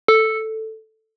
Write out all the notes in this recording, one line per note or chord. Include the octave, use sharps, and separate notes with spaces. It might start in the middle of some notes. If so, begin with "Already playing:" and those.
A4